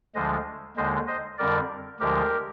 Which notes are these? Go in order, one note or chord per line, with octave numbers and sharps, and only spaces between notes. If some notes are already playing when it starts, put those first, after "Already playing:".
D2 D3 F3 G#3 C5 D#5
D#2 D3 G#3 C5 D#5
C5 D#5
F2 D3 G3 A#4 D5
D2 D3 F3 G#3 G4 A#4